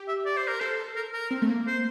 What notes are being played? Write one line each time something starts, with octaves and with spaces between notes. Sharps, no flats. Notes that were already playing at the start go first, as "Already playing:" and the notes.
Already playing: G4
E5
D5
C5
A#4
A4 C5
A#4
A#4
C4
A3
A#3
C5